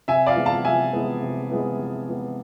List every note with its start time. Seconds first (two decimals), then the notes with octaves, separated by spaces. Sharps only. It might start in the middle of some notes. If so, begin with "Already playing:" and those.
0.08 C3 E5 G#5
0.27 D5 F5
0.36 E3 G#3 B3
0.46 F5 A5
0.65 C3 E5 G#5
0.93 E3 G#3 B3
1.22 C3
1.51 E3 G#3 B3
1.79 C3
2.08 E3 G#3 B3